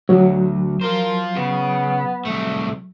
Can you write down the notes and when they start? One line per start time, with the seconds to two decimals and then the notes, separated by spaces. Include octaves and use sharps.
0.09 D2 F#3
0.81 F4 A#4 C5
1.35 C#3 B3
2.25 C2 A3